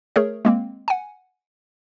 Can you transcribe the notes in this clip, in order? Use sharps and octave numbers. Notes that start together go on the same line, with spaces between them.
A3 G#4 A#4 C#5
G#3 A#3 C4
F#5 G#5